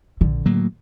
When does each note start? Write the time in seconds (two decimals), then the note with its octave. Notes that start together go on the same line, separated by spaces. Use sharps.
0.21 A#1 D3
0.46 A2 F#3 A#3